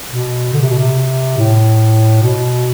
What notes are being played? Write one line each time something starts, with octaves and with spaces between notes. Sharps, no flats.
B2
D3
C3
B2
C3
A2
B2